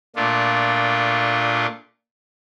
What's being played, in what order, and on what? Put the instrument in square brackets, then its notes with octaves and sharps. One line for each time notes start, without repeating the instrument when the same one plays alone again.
[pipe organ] A#2 A3 D4 F4